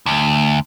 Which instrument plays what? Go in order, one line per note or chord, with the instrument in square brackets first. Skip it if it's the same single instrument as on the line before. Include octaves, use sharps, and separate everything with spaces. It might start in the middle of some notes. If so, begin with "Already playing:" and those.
[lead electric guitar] D2